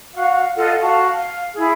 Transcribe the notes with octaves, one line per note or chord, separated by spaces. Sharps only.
F#4 F5 F#5
F4 A4 D#5 F#5
F#4 F5 A5
F5
E4 G#4